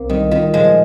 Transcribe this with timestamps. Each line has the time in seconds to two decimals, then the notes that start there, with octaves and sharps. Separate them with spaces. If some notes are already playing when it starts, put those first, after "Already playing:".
Already playing: C2 A#3 C4
0.10 D#3 G3
0.31 D#3 F4
0.54 A#2 F3 G#3